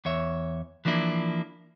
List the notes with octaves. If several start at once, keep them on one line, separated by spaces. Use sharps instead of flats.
E2 C#5 E5
E3 F3 A#3 D4 E4